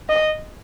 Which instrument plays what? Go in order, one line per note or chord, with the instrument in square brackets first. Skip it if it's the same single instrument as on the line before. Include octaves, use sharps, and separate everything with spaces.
[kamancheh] D#5